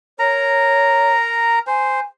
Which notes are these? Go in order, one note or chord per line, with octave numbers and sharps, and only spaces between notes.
A#4 C#5 A#5
C5 G#5